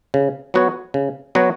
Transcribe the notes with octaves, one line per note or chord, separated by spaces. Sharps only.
C#3
F#3 B3 F#4 C#5
C#3
F#3 B3 F#4 C#5